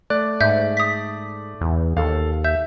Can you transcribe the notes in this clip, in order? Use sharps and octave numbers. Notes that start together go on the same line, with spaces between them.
A3 D5 F#6
G#2 E5 G6
D#6 B6
E2
D#2 A4 F5
E5 G6